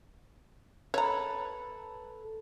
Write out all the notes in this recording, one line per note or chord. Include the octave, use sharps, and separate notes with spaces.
A4 B4 C#5 A#5